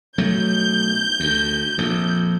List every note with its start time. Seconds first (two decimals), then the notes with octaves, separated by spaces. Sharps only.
0.18 B1 F#3 A3 G6
1.20 D2
1.78 A#1 F2